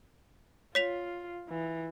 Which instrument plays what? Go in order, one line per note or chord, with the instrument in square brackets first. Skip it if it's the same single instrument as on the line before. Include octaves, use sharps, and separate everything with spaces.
[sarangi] F4 [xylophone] C#5 B6 F7
[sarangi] E3